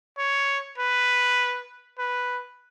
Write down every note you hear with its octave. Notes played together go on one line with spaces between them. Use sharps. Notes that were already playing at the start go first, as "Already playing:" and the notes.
C#5
B4
B4